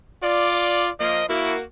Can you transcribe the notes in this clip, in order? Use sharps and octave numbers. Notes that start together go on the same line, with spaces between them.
F4 D5
F3 A#3 D#5
A#3 E4 F#4